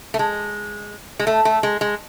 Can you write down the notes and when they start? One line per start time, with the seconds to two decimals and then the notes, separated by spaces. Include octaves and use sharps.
0.14 A3
0.19 G#3
1.19 G#3
1.27 A3
1.45 A3
1.63 G#3
1.81 G#3